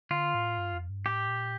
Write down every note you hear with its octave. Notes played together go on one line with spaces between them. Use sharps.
D3 F4
A2
G2
F2
G2
A2 G4
A#2